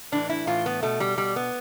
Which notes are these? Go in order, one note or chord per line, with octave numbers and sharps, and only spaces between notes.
A2 E3 D4
E4
A2 E3 F4
B3
B2 A3
G3
B2 G3
B3